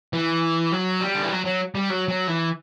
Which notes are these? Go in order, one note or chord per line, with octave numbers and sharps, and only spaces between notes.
E3
F#3
G3
D3
E3
F#3
F#3
G3
F#3
F#3
E3